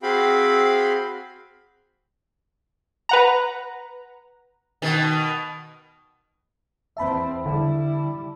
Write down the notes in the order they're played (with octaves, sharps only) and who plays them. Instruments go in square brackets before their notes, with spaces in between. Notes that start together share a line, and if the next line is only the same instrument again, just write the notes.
[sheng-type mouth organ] C4 F#4 G#4 F5 G5 B5
[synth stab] B4 F#5 A#5
[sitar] B2 D#3
[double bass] E2 C4 [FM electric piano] E5 A5 B5
[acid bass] D3 [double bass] G3 E4